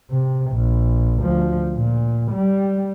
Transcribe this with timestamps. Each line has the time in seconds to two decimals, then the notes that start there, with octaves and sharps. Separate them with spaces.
0.10 C3
0.51 A#1
1.22 D2 F3
1.76 A#2
2.32 G3